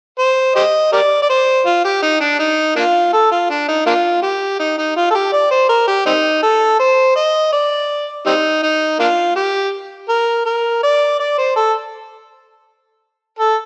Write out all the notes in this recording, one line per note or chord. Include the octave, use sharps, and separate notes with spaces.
C5
G4 C5 D#5
G4 A#4 D5
D5
C5
F4
G4
D#4
D4
D#4
A#3 D4 F4
A4
F4
D4
D#4
A#3 D4 F4
G4
D#4
D#4
F4
A4
G4
D5
C5
A#4
G4
G3 C4 D#4
A4
C5
D#5
D5
G3 C4 D#4
D#4
A#3 D4 F4
G4
A#4
A#4
D5
D5
C5
A4
A4